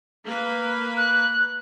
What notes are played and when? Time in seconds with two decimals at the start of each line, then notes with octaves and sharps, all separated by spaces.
0.25 A#3 B4
0.97 F#6